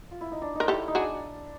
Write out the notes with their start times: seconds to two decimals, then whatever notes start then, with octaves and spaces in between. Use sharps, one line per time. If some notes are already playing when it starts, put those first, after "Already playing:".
0.11 F4
0.21 E4
0.32 D#4
0.42 D4
0.55 D#4 A#4
0.68 E4 G4 A4
0.88 D#4
0.95 D4 F#4 G#4